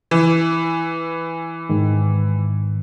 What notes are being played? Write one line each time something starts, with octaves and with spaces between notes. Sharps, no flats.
E3
G#2 D#3